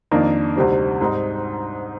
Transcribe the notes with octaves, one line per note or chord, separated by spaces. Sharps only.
F2 D#3 A#3 D4
D2 C3 G3 C4 D#4
G#2 G3 C4 D#4